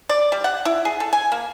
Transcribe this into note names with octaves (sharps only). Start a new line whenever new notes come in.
D5
G3
F#5
E4
G#4
A4
G#5
A#3